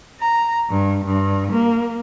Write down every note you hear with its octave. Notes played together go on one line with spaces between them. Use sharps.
A#5
G2
G2
A#3